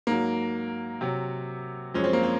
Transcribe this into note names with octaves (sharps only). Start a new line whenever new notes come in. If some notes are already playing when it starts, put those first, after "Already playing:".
G#2 F#3 A#3
C3 F#3
F#2 F3 G#3 C#4
C4
A#3
C4